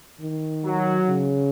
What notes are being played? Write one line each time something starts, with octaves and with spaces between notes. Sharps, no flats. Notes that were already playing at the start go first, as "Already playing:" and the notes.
D#3
F#3
C#3